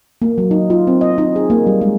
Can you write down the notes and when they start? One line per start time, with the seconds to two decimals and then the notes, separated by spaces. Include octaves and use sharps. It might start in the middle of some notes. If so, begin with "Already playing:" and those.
0.22 A#3
0.38 F#3
0.51 D#4
0.70 F4
0.87 C4
1.01 D#5
1.18 D#4
1.36 G#4
1.50 A#3
1.67 G3
1.81 G#3